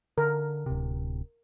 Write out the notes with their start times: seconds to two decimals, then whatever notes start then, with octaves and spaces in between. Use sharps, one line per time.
0.18 D3 A#4
0.66 D1 C3